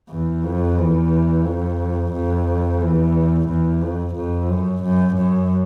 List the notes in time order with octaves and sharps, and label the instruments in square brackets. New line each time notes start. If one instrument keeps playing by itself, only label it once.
[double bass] E2
F2
E2
F2
F2
E2
E2
F2
F2
F#2
F#2
F#2